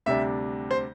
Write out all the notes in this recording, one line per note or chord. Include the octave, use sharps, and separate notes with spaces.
D2 C3 G3 D4 E5
C5